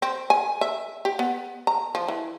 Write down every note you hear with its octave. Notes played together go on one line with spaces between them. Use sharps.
C4
G#5
E5
G4
B3
A#5
F3
E3